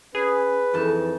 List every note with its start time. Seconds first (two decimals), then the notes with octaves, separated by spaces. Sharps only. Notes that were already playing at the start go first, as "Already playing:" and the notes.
0.15 C#4 G#4 B4
0.74 F2 D#3 E3 A5